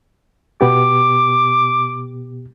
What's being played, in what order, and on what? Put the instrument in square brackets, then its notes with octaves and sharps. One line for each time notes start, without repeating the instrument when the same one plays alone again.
[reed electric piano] B2 B3 G4 [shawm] D6